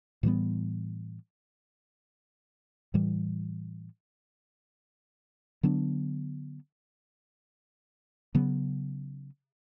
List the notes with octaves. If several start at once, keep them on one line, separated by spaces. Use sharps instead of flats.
A2 E3 G3 B3
A2 E3 G3
D3 F#3 B3 D4
C#3 F#3 B3